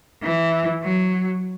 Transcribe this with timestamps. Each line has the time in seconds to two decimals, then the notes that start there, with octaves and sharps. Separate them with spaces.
0.22 E3
0.83 F#3